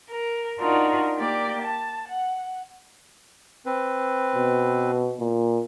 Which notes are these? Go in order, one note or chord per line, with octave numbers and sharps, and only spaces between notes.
A#4
D4 D#4 F4 F#4 A#4
A#3 G4 D5
A5
F#5
C4 B4
B2
A#2